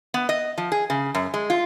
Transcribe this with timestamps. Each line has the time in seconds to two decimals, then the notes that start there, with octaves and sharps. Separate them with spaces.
0.14 B3
0.29 D#5
0.58 F3
0.72 G#4
0.90 C#3
1.15 F#2
1.34 G#3
1.50 F4